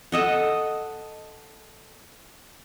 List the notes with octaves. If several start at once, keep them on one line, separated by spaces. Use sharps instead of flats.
A4 D#5 F#5